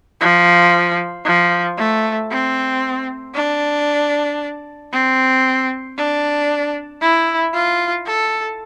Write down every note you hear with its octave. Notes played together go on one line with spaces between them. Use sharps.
F3
F3
A3
C4
D4
C4
D4
E4
F4
A4